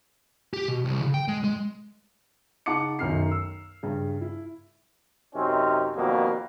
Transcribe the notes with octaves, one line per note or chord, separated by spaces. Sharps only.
G4
B2
C2
C#3
G5
G#3
G#3
C#3 D#4 F#5 A5 D6 C#7
B1 F#2 D#3 F6 C7
E6
G2 C#3
E4
F#2 C3 C4 C#4 D#4
F2 B2 D#3 G3 A#3